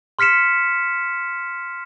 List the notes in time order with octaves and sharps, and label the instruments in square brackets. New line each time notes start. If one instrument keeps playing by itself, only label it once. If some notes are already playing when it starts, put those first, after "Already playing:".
[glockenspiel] C6 F6 B6 C#7 E7